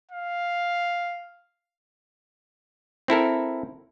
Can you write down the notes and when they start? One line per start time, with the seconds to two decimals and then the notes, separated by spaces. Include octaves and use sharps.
0.11 F5
3.08 C4 E4 A4 A#4